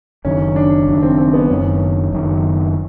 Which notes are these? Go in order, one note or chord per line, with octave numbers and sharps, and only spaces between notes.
F#1 F#2 D#3 C#4
D4
F#1 F#2 D#3
C4
C4
B3
F#1 F#2 D#3 C#4
F#1 F#2 D#3